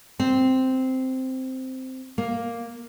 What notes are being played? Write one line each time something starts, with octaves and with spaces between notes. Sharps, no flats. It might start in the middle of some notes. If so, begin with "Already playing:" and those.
C4
A#3